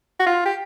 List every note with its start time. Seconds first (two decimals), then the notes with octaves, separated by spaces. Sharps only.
0.20 F#4
0.26 F4
0.46 G4